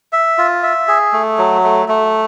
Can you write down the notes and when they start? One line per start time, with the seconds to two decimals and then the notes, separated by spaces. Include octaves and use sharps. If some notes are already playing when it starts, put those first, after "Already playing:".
0.13 E5
0.38 F4
0.63 E5
0.88 G#4
1.13 A3
1.38 F#3
1.64 A3
1.89 A3